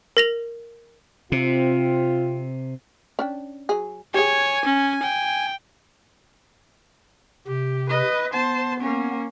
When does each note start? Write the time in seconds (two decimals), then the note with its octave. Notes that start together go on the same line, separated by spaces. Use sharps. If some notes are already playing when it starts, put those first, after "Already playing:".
0.17 A#4 A#6 F7
1.32 C3 C4 F4
3.19 C#4 D4 G5
3.69 F#3 G#4
4.14 G4 G#4 C#5 G#5
4.65 C#4
5.03 G5
7.47 C3 G4
7.89 B4 D#5
8.33 B3 C5 A5
8.80 A#3 C#4